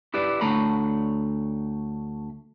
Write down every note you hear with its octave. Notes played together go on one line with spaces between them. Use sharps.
E4 G4 B4 D5
D2 A3 C#5 A#5 B5